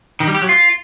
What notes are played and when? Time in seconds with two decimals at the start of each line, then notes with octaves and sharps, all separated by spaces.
0.20 D#3
0.27 G3
0.35 G4
0.42 F#3
0.49 F4